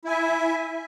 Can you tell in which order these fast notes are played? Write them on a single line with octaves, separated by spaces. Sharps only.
E4 G#5 E5